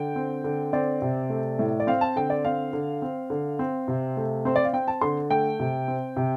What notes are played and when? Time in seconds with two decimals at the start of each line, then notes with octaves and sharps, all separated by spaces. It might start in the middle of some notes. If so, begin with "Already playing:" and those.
Already playing: D3 G5
0.16 C4
0.44 D3
0.73 C4 D5
1.02 C3
1.30 A3
1.59 A2
1.80 D5
1.87 C4 F5
2.01 A5
2.16 D3 G5
2.30 D5
2.45 C4 F5
2.73 D3
3.02 C4
3.30 D3
3.59 C4
3.88 C3
4.17 A3
4.45 C4 C5
4.56 D5
4.64 F5
4.73 C4 G5
4.88 A5
5.01 D3 C6
5.30 A3 G5
5.60 C3
5.88 C4
6.16 C3